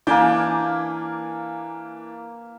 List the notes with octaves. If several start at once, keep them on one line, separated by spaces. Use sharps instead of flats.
E3 A#3 D4 G#5 D6 G6